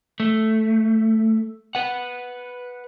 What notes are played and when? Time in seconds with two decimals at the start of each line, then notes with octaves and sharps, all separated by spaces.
0.20 A3
1.75 B4 F#5